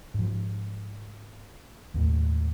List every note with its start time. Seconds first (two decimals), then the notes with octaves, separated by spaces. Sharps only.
0.14 G#2 F3
1.94 D#2 A2